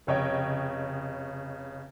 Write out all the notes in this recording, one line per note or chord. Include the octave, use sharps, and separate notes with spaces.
F1 C#3 C#5 D#5 G5